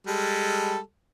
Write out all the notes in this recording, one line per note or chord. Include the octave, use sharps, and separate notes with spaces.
G3 G#3 A4